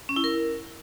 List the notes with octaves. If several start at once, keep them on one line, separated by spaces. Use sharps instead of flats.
C#4
E4
A#4